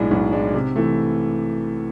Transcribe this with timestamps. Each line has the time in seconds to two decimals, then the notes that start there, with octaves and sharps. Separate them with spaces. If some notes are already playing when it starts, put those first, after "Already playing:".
Already playing: B1 A2 G#3 D4
0.11 B1
0.32 A2 G#3 D4
0.54 C3
0.76 E3 A3